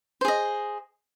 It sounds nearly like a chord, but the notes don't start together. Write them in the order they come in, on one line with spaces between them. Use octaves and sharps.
C5 G#4 D#5